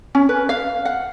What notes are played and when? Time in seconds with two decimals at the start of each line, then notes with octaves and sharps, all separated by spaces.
0.15 C#4
0.29 B4
0.49 F5
0.85 F#5